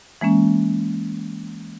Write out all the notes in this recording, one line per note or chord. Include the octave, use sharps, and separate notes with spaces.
E3 G#3 A#3 C#4